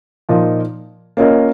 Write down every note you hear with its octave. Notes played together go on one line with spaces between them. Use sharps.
A#2 F3 A#3 D#4
A#3 C#4 F4 A#4 D#5